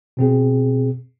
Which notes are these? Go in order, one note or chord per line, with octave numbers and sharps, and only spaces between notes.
B2 C4 G#4